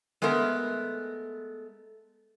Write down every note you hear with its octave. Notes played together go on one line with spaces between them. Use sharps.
G#3 A3 B3 A#4